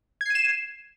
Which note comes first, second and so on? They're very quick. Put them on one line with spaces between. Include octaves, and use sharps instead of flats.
G#6 C7 D#7 E7